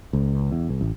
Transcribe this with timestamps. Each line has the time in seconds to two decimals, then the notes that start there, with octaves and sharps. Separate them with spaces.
0.13 C#2
0.51 E2
0.69 C2
0.81 A1